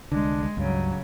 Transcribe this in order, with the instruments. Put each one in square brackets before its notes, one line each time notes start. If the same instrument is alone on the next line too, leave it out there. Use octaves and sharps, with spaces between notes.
[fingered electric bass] C2 D3 [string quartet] G#3 [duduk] D4
[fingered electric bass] C#2 G2 [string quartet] C#3 [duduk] F#3